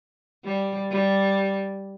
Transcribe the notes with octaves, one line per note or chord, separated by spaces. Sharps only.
G3
G3